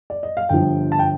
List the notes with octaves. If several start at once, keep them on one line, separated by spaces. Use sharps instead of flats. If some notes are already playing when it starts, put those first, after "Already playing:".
D5
D#5
F5
G1 G2 F3 G5
A5
G5